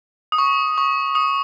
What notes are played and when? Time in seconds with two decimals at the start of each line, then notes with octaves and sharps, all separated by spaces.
0.32 D#6
0.38 C#6
0.78 C#6
1.15 D#6